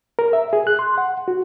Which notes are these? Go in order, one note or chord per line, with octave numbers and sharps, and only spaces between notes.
A#4
E5
G#4
F#6
C6
F#5
F#4